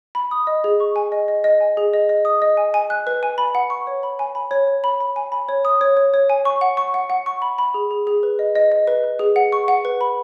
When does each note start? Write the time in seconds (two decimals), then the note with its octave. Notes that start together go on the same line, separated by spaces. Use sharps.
0.15 B5
0.31 D#6
0.47 D#5
0.64 G#4
0.80 C#6
0.96 G#5
1.12 D#5
1.28 D#5
1.44 D#5
1.61 G#5
1.77 G#4
1.93 D#5
2.09 D#5
2.25 D#6
2.42 D#5
2.57 G#5
2.74 G#5
2.90 F#6
3.07 B4
3.23 G#5
3.38 B5
3.55 F#5
3.70 C#6
3.87 C#5
4.03 B5
4.19 G#5
4.35 B5
4.51 C#5
4.68 C#5
4.84 B5
5.00 B5
5.16 G#5
5.32 B5
5.49 C#5
5.65 D#6
5.81 C#5
5.97 C#5
6.14 C#5
6.30 G#5
6.45 C#6
6.61 F#5
6.77 C#6
6.94 F#5
7.10 F#5
7.26 C#6
7.42 B5
7.58 B5
7.74 G#4
7.91 G#4
8.07 G#4
8.23 B4
8.39 D#5
8.55 D#5
8.72 D#5
8.87 B4
9.04 B4
9.19 G#4
9.36 F#5
9.52 C#6
9.68 F#5
9.85 B4
10.01 B5